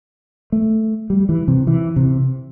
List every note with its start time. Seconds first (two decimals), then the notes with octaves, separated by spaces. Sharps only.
0.52 A3
1.10 G3
1.29 E3
1.48 C3
1.67 E3
1.96 C3